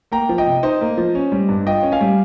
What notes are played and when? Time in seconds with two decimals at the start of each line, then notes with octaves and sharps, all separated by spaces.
0.12 A#3 G5 A#5
0.29 F3
0.38 D#5 G5
0.47 C3
0.63 D#4 C5 D#5
0.81 A#3
0.98 F3
1.15 C#4
1.32 G3
1.49 G2
1.67 F4 D#5 G5
1.83 C#4
1.92 F5 G#5
2.01 G3